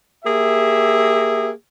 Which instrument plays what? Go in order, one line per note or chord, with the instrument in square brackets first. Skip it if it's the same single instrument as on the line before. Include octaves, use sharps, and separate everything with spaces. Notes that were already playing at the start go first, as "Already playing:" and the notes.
[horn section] A#3 G4 G#4 E5